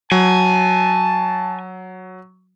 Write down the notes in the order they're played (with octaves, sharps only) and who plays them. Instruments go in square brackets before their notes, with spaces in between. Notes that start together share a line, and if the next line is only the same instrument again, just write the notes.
[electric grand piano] F#3 [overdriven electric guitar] G#5 [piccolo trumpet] A5